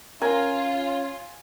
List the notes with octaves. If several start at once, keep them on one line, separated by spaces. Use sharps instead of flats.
C#4 F4 A#4 G#5